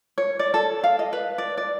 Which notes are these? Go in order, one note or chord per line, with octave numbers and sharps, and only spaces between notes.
C#5
D5
A4
F5
D#5
B4
D5
D5